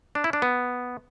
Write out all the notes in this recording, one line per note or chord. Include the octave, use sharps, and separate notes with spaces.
D4
E4
D4
B3